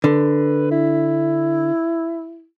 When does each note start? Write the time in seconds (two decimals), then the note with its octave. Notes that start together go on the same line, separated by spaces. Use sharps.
0.04 D3 B4
0.71 E4